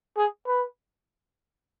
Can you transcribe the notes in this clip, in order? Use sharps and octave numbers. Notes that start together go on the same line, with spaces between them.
G#4
B4